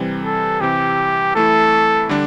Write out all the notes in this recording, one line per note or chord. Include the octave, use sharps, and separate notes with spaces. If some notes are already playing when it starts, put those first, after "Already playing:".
Already playing: C3 E3 G3 C4
A4
C3 E3 C4 G4
E3 A3 E4 A4
D3 G3 D4